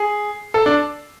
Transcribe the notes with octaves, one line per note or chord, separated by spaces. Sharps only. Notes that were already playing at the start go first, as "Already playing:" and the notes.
Already playing: G#4
A4
D4